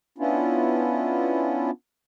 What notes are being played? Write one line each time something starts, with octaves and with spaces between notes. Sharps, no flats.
B3 C#4 D4 E4 F4